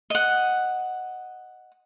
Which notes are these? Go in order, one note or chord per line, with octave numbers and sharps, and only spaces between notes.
D#5 F#5